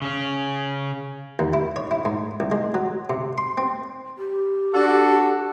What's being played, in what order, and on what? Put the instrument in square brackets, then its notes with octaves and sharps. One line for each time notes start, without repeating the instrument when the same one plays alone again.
[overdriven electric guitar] C#3 C#4
[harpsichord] D#2
E4
C#5
E4
G#2
C2
G#3
F#3
C3
C6
C4
[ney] G4
[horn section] D4 F#4 A4